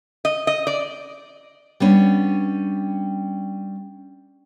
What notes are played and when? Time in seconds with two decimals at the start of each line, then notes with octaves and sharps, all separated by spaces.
0.25 D#5
0.47 D#5
0.67 D5
1.80 G3 B3 C#4 D4